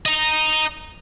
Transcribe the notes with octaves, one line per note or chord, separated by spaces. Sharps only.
D#5 A#5